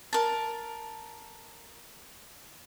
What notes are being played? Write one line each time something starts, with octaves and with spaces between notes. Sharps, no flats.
A#4 A5